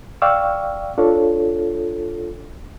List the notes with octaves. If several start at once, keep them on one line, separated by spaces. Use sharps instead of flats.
D5 F5 G5 C#6 E6
D4 F4 A4 C#5